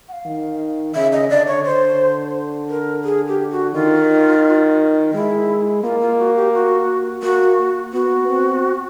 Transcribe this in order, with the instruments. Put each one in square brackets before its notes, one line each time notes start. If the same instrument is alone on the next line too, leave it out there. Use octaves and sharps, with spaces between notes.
[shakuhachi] F#5
F5
[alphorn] D#3
[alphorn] C#3 [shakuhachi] E5
[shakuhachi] D#5
[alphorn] D3 [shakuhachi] D5
[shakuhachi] C#5
[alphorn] D3 [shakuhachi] C5
[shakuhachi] A#4
G#4
G4
F#4
[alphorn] D#3 [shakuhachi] F4
[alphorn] G#3 [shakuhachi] E4
[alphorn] A#3 [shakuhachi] F4
[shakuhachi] F4
F#4
G4
F#4
[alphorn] A#3 [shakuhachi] F#4
[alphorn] B3 [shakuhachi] F#4
[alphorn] C4